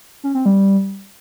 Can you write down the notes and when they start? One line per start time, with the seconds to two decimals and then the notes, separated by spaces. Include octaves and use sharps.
0.24 C#4
0.35 C4
0.46 G3